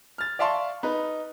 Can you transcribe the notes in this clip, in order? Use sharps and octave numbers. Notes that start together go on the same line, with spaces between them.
F6 A6
D5 E5 F5 A5 C6 C#6
D#4 B4